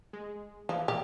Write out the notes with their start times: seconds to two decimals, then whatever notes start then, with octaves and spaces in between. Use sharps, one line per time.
0.13 G#3
0.69 E3 F3
0.88 A#2 G4